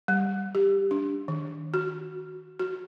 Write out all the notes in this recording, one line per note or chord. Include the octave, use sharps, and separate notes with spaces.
G3
G4
D4
D#3
F#4
F#4